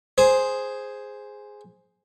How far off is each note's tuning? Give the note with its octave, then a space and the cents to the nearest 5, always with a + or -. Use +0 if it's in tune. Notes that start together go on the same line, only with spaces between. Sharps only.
G#4 +0 C5 +0